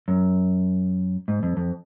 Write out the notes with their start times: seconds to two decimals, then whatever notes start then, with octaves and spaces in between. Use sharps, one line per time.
0.08 F#2
1.28 G#2
1.43 F2
1.57 F2